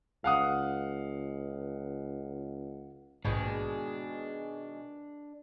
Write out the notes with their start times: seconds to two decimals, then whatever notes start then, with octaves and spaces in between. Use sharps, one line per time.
0.24 C#2 F5 F#5 D#6
3.25 A#1 G#2 B2 D#3 G#3 D4